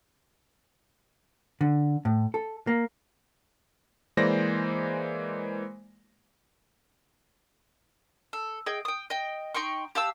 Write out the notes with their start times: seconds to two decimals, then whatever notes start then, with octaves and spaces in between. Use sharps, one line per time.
1.61 D3
2.05 A2
2.34 A4
2.67 A#3
4.17 E3 G#3 A#3 C5 D5 A#6
8.33 A4
8.66 G#4 D#5 G5
8.85 G5 D#6
9.10 D#5 G5
9.54 D#4 G5 C6 C#6
9.95 G4 F5 A5 E6